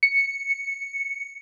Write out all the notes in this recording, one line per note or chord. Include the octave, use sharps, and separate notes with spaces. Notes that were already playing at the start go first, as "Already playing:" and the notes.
C#7